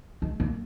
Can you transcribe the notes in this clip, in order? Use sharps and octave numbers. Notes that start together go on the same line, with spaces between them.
G#3
A#3